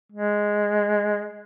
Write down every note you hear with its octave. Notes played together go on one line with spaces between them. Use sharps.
G#3